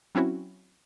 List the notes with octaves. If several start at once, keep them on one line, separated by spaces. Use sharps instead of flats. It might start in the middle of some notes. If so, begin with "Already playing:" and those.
F#3 C4 C#4 E4 F#4